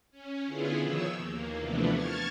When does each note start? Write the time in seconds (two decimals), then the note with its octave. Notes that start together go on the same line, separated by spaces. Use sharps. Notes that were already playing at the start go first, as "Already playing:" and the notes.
0.11 C#4
0.46 D3 B3 E4 F4 G#4
0.79 B2 D#3 F3 C#5 E6
1.17 D#2 A#3
1.58 C3 E3 F3 A3 B3 D4
1.91 A5 C#6 F6 G#6 A6